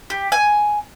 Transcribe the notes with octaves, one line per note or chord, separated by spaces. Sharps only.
G4
G#5